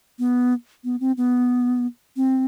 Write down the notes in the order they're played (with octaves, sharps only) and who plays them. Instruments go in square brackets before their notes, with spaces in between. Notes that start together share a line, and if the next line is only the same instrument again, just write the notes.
[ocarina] B3
B3
C4
B3
C4